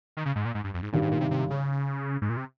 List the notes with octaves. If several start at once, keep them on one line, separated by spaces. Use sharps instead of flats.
D#3
C#3
G#2
A#2
G#2
G2
F2
G#2
G#1 G2 A#2 D#3 G3
G#2
A#2
C3
C3
C#3
G#2
A#2
C3